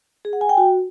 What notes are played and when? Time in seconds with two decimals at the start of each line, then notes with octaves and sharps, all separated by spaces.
0.25 G#4
0.33 F#5
0.41 G#5
0.49 G5
0.58 F#4